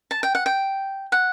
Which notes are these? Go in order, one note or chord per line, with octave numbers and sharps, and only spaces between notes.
A5
G5
F#5
G5
F#5